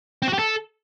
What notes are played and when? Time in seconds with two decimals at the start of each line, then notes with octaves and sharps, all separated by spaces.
0.22 C4
0.28 F#4
0.33 G4
0.39 A4